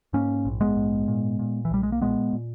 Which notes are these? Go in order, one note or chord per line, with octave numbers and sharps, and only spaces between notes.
G#2 A#3 C#4
A#1
G#3 B3
G#2
A#2
A#2
E3
B1 G3
G#3
A#3
A#2 G#3 B3
A#2